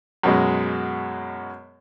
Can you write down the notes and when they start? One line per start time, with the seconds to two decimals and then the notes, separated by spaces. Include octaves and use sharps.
0.23 F#2 B2 G#3